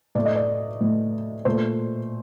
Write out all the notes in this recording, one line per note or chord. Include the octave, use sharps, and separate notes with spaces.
A2 A3 D5
D#5
D5
A2 A3
A#2 A3 C5